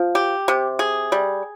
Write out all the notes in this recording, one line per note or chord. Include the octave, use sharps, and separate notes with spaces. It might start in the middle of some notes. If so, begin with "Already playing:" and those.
Already playing: F3
G4
C3
G#4
G3